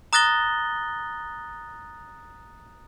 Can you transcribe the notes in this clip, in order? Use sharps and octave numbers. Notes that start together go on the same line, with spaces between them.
A#5 D#6 F#6 A6 A#6 G7